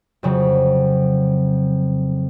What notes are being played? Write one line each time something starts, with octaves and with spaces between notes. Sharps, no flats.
F2 C#3 F#3